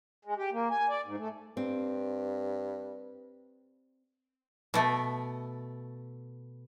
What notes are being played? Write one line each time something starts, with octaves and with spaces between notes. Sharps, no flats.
G#3
G4
A#3
G#5
D5
G#2
A3
G2 C4
B2 A3